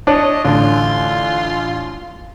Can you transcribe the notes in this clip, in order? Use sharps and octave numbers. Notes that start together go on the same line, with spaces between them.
D4 C#5 D#5 A5
A1 D3 F4